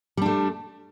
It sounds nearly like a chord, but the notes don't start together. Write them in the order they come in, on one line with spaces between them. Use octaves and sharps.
G3 D4 A3